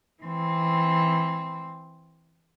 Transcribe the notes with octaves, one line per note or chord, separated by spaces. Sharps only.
E3 C4